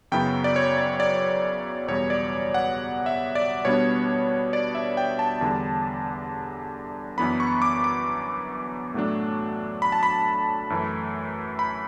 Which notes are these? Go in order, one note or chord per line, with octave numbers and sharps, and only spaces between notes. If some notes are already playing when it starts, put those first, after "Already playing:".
F#2 C#3 F#3 B3 E4 G5
D5
C#5
D5
D5
E2 B2 G3 C#5
D5
F#5
E5
D5
B2 G3 B3 D4 C#5
D5
E5
G5
A5
E2 D3 G3 D4
F#2 E3 B3 D4 B5
C#6
D6
D6
A2 F#3 A3 D4
B5
A5
B5
F#2 E3 A3
B5